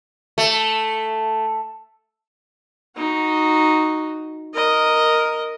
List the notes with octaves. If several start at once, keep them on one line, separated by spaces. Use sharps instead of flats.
A3
D#4 F#4
A#4 D#5